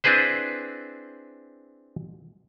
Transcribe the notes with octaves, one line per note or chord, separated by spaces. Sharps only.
C4 D4 E4 G#4 B4 C5